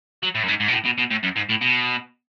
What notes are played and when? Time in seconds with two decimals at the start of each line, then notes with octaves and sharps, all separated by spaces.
0.23 F#3
0.35 A2
0.43 F#2
0.48 G#2
0.60 G#2
0.68 B2
0.73 A2
0.85 B2
0.98 B2
1.11 A2
1.23 F#2
1.36 G#2
1.49 A2
1.61 B2